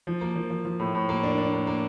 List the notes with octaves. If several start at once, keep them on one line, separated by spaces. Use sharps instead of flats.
F3
A#3
F3
F3
F3
A2
A2
A#3
D4
D4
A#3
A#3